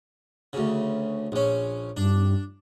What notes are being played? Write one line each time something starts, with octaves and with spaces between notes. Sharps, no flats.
D2 C#3
A#1 C#4
G2 D4